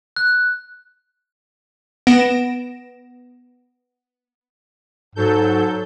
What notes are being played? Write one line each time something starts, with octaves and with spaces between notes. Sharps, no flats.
F#6
B3 A#6 D7 E7
G#2 F#3 A4 G6